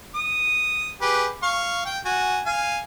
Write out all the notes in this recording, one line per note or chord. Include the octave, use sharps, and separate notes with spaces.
D#6
G4 G#4 B4
F5 C#6
G5
F#4 G#5
F5 G#5